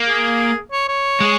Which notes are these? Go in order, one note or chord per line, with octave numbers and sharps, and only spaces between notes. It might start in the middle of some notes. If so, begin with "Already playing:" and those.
Already playing: A#3
G#4
C#5
C#5
G#3